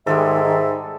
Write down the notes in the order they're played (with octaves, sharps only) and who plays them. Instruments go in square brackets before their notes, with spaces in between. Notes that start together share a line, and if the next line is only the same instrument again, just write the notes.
[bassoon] G#2 [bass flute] D#3 [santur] G3 G#3 A4 [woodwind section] E5